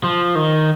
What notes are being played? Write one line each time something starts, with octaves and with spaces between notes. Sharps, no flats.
F3
D#3